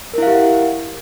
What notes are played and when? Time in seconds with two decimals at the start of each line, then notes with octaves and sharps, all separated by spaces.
0.14 A#4
0.18 E4
0.23 F5
0.27 G4
0.32 F#5